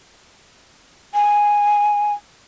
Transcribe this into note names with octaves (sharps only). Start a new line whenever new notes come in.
G#5